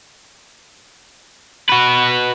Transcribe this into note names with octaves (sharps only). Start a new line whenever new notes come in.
F#4 B4